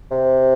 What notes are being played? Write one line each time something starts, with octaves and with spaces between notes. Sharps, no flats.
C3